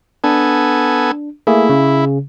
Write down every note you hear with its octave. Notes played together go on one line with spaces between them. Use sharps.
B3 D4 A4 G#5
A3 A#3 E4 G#4
C#3